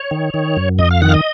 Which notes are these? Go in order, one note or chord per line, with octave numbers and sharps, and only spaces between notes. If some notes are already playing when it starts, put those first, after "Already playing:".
Already playing: C#5
D#3
D#3
F#2
F2 D#5
F5
D#3 F#5
F5
D#5